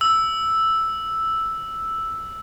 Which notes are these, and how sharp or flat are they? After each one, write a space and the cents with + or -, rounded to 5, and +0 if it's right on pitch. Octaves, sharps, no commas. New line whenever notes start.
E6 +0